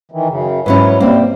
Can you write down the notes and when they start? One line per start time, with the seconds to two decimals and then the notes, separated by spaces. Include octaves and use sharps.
0.12 D#3 E3
0.29 F#2 C#3
0.66 G#2 F#3 C#4 E4 B4
1.00 C3 G3 A#3 C4